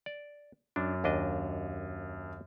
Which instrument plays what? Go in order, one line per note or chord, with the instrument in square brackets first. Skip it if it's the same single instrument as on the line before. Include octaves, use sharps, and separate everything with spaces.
[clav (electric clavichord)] D5
[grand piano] F#2 [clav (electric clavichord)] D4
[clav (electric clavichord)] D#2 D4 D#5